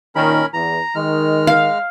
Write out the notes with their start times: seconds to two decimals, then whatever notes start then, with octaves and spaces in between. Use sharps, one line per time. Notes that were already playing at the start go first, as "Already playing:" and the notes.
0.16 A#2 D#3 C#4 A#4 B5
0.53 E2 A#5
0.95 D#3 G#3 F6
1.47 F5